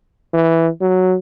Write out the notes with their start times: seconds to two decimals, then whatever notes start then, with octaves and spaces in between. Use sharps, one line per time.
0.34 E3
0.81 F#3